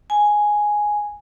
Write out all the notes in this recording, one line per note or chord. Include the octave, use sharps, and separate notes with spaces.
G#5